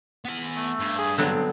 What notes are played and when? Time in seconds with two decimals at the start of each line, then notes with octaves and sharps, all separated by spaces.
0.25 B3 G#5
0.56 A3
0.79 G2
0.98 G#4
1.18 D3 F#3 B3 C4